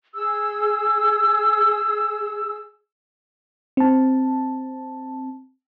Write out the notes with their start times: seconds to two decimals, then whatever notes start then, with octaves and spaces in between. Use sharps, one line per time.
0.15 G#4 E6
3.77 C4 A5